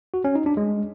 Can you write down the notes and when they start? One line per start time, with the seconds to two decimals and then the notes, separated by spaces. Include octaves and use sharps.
0.14 F#4
0.24 C#4
0.35 D#4
0.46 D4
0.57 G#3